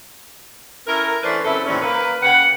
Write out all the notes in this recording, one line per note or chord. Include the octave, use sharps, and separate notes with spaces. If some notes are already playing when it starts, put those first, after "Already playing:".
C#4 E4 A4 A#4
E3 A3 C#4 D4 B4 C5
F#2 C#3 C4 E4 A4 E5
D#2 A2 E3 C4 C#4 D5
A#3 B4
C#3 G4 B4 F#5